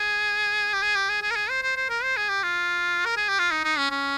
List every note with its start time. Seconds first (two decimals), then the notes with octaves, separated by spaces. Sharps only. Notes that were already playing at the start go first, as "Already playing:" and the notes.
Already playing: G#4
0.74 G4
0.82 G#4
0.95 G4
1.09 G#4
1.22 G#4
1.31 A#4
1.36 G#4
1.50 C5
1.63 C5
1.76 C5
1.89 A#4
2.03 C5
2.17 G#4
2.29 G4
2.43 F4
3.05 A#4
3.17 G#4
3.29 G4
3.39 F4
3.51 D#4
3.64 D#4
3.78 C#4
3.91 C#4